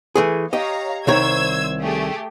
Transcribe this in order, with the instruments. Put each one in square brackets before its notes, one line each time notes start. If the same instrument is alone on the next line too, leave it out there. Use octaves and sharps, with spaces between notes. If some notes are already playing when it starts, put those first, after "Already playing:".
[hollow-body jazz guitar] E3 A3 G#4
[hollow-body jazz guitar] G4 D#5 [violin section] C#5 F5 A#5
[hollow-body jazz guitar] C2 D#3 C#5 [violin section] C5 E6 G#6
[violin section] A3 G4 G#4